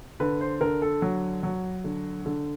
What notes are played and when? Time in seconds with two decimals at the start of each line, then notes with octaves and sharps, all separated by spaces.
0.20 D3 B4
0.41 C5
0.61 D3 A#4
0.82 A4
1.02 F#3
1.43 F#3
1.84 D3
2.26 D3